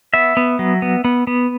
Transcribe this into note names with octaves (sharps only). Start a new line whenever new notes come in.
B3 E5
B3
F#3
B3
B3
B3